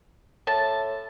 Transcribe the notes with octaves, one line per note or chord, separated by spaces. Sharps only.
A2 A5